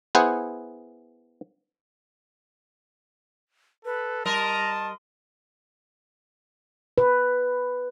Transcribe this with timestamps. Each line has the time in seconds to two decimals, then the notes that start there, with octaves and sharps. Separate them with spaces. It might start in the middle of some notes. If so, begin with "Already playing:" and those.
0.15 B3 E4 G#4 C5 F#5
3.85 A4 B4
4.25 G3 A#4 D#5 A5 A#5 C6
6.98 B4